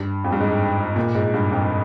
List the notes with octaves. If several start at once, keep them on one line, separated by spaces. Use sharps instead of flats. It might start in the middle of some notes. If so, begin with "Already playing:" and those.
Already playing: G2
F2
G2
G#2
A#2
G#2
G2
F2